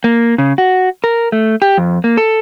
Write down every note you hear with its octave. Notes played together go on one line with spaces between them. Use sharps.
A#3
C#3
F#4
A#4
A3
G4
F2
A#3
A4